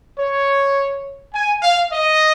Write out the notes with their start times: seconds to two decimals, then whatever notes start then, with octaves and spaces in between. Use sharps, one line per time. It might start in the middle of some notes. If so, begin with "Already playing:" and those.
0.18 C#5
1.33 G#5
1.62 F5
1.92 D#5